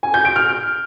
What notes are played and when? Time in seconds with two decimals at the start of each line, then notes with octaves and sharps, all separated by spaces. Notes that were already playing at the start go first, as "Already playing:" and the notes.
0.03 G#5
0.14 G6
0.25 D7
0.36 F6